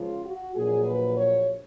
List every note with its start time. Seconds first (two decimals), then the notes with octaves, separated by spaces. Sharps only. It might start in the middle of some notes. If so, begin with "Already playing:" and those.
Already playing: C#2 C#3 F3 F4
0.24 F#4
0.55 A#1 A#2 F#3 G#4
0.85 B4
1.16 C#5